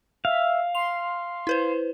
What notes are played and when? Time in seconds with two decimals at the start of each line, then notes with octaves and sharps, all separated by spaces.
0.25 E5 F5
0.75 C6 F7
1.47 E4 B4 C5